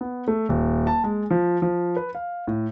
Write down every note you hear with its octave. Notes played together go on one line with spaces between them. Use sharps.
B3
A3
D#1
A5
G#3
F3
F3
B4
F5
A2